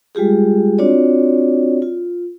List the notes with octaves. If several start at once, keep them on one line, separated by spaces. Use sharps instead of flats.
G3 G#3 F4 G4 G#4
C4 D4 F4 F#4 C#5 D5
F4